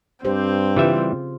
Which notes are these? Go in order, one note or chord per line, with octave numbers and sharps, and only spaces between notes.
G2 C4 G4 C5
C#3 E3 G3 F4 E5